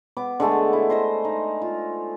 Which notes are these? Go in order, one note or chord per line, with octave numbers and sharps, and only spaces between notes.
B3 D6
D3 G#3 A3 A5
E4
C5 D#5 C6
D#4
F4